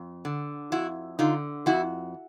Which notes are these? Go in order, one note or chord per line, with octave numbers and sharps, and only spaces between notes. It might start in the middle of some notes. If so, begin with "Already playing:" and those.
Already playing: F2
D3
F2 E4 F#4
D3 D#4 F4
F2 E4 F#4